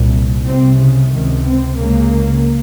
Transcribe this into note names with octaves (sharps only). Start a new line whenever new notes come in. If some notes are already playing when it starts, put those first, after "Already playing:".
Already playing: C2 A#2
C2 C3 C4
C#3
C#2 C3 D#3
C4
C#2 C#3 A#3